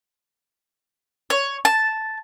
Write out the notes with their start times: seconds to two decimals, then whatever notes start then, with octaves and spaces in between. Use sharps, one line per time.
1.30 C#5
1.65 A5